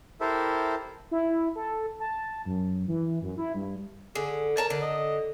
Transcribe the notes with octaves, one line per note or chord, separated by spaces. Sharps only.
E4 G4 A4 A#4 C5 E5
E4
A4
A5
F#2
E3
F#2
E4
G2
D3 G#4
A#4 C#5 A5 A#5
D3
D#5